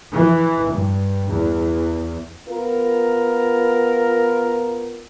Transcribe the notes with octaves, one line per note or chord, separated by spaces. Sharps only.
E3
G2
E2
B3 F4 A#4